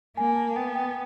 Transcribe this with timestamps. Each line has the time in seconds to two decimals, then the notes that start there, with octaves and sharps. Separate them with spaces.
0.17 A#3 G#5
0.36 A5
0.56 B3 G5
0.75 G5